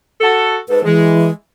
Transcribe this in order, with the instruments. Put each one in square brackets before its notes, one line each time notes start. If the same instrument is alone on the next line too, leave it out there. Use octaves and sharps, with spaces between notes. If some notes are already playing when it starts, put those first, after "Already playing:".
[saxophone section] F#4 A4
[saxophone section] G#2 A4 [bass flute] B4
[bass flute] E3 [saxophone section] G#3